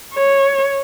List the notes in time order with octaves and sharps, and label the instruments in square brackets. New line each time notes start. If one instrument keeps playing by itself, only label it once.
[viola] C#5